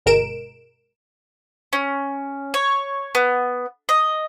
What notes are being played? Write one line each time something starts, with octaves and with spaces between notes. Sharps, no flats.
G1 B2 G#3 A#4 D7 E7
C#4
C#5
B3
D#5